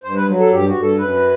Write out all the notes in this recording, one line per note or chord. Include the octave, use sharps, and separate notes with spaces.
G2 C5
B4
F#3
A4
G2 G4
F#4
G2
A4
F#2 B4